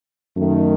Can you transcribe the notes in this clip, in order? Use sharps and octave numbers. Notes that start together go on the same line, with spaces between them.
F#2 D#3 A3